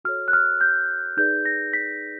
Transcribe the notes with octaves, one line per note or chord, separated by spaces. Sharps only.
F#4 A4 C#5 F6
F#6
F6
G6
D#4 G#4 B4 D5 G6
A#6
B6